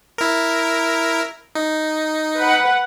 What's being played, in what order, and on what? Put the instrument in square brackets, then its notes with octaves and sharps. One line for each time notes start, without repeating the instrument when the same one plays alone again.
[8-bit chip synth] E4 A#4
D#4
[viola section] B4 F#5